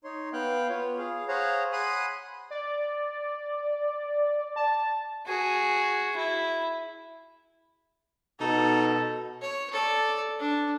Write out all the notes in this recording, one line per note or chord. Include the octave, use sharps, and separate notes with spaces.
D#4 C#5 C6
B3 F5 G5 F#6
B3 F4 C#5
G#4 F5
G#4 C5 C#5 F5 F#5 A#5
F#5 G#5 B5 C6 D#6
D5
A5
F#4 G#4
E4
B2 D#4 A4
C#5
A4 D5
D4